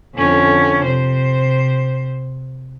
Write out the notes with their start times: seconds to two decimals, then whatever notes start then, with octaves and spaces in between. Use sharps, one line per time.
0.15 F2 D3 C#4
0.84 C3 C5